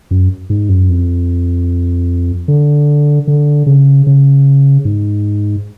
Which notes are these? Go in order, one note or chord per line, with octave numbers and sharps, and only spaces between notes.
F#2
G#2
F#2
F2
D3
D3
C#3
C#3
G#2